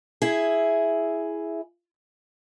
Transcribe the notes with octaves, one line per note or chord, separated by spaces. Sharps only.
E4 G#4